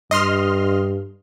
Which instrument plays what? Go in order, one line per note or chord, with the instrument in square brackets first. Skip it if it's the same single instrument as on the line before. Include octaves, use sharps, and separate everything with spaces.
[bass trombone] G2 [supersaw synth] D#5 C6 F6